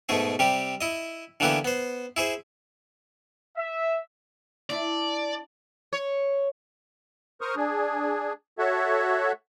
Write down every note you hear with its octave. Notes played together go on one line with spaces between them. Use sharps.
G#2 B2 A3 G#4
C3 G3 G4
E4 D#5
D3 E3 A#3 B3 E4 G4
B3 C5
E4 G#4 C5
E5
D4 E4 D5
C#5
A#4 C5 C#6 D#6 F6
D4 G#4
F#4 A4 C#5 E5 F#5